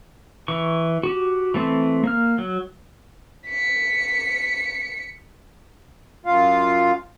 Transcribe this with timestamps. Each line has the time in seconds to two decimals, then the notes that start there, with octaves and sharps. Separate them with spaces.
0.48 E3 C#6
1.03 F#4 G4
1.54 E3 A3 C4
2.04 A#3 F6
2.38 F#3
3.47 B6 C#7
6.26 F#2 F4 F5